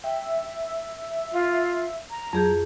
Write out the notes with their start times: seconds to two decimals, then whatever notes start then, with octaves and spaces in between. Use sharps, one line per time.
0.04 E5 G5
1.32 F4
2.10 A#5
2.33 F2 F#3 G#4 G6